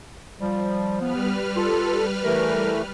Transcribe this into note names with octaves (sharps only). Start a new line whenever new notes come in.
F3 G3
G3 B3 B4 F6
F4 A4
E3 A3 A#4